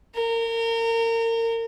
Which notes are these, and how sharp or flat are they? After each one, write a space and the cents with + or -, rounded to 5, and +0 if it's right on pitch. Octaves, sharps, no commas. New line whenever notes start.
A#4 -30